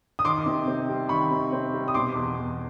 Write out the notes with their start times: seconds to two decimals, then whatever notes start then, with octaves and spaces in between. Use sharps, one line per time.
0.19 D#6
0.25 D#3 C6 D6
0.46 C3
0.67 C4
0.89 G3
1.09 D#3 B5 C#6
1.31 C3
1.52 C4
1.74 G3
1.88 D#6
1.94 B2 C6 D6
2.16 E2
2.37 E2